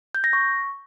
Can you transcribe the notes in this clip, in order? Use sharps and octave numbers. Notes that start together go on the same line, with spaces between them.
G6
A#6
C#6